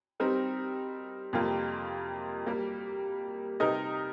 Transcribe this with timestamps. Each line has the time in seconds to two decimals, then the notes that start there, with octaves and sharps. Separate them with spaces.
0.20 G3 C4 D#4 A#4
1.33 F2 C3 G3 A#3 F4
2.46 G3 A#3 G4
3.60 C3 G3 D#4 A#4 D#5